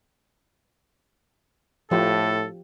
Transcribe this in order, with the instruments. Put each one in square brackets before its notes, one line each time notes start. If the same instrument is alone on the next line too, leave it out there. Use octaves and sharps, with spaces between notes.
[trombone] A2 [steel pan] F3 G4 [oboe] A4